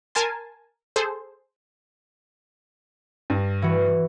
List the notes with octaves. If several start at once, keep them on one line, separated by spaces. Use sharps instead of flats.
A#4 G#5 A5 C6
G#4 A4 C5
G2
E3 F#4